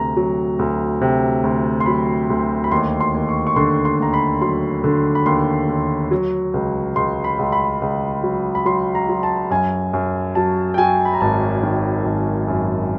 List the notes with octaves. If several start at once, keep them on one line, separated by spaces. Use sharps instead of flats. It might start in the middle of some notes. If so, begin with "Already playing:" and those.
Already playing: D2 C3 A#5
F#3
D2
C3
D2
C6
F#3 B5
D2
B5
D#2 C6
C6
D#2
C#6
C#6
D3 C6
C6
D#2 A#5
B5
F#3 C6
D3
B5
D#2 C6
D#2
F#3
C#2
C#2 C6
B5
C#2
B5
C#2
F#3
B5
F#3 C6
A#5
F#3
A5
F#2 G#5
F#2
F#3 A5
G5
F#3 G#5
B5
A#5
G#1 A5
D#3
G#1
F#2